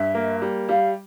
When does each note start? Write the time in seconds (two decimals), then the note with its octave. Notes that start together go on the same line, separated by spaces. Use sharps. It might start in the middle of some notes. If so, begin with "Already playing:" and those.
Already playing: G2 E5
0.15 A#3
0.42 G3
0.69 G3 F5